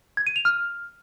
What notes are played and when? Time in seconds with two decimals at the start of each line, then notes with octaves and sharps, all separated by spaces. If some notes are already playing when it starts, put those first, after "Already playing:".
0.17 G#6
0.27 D#7
0.36 F7
0.45 F6